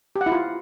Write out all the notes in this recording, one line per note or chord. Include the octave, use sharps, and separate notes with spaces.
G4
F#5
E4
F4